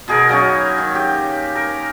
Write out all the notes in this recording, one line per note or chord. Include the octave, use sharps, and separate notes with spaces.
B2 G#4 A#4
F#3 A#3 C#4 D#4
D#3
G4
A#4